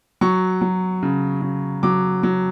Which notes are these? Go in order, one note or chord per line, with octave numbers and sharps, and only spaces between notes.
F#3 C#6
F#3
C#3
C#3
F#3 D6
F#3